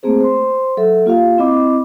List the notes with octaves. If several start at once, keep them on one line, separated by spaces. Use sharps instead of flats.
A3 A#3 C4 G#4 C5
C5 C6
F#3 A4 E5
A#3 F4 G4 F5
C4 E4 D#5 B5 D6